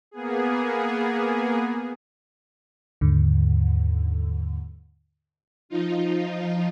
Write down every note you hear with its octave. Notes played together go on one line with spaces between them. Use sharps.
A#3 B3 G#4
D#2 G#2 D3
F3 D#4 F4